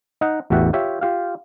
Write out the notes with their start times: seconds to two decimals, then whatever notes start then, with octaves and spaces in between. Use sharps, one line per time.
0.21 D#4 D#5 F#5
0.50 A1 E2 F#4 G4 E5 F#5
0.73 F4 G4 C#5 E5
1.01 F4 G4 F5